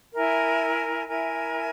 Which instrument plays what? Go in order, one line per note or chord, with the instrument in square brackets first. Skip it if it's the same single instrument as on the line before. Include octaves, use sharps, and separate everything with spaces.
[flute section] E4 A#4 E5 G#5
E4 A#4 E5 G#5